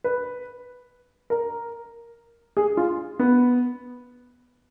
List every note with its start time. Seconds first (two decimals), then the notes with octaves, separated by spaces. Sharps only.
0.04 B4
1.30 A#4
2.57 G#4
2.77 F4
3.19 B3